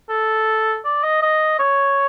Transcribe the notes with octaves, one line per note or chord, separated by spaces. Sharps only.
A4
D5
D#5
D#5
C#5